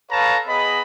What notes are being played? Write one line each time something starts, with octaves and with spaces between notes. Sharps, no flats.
A4 B4 C#5 F5 A5 A#5
B3 G#4 D#5 B5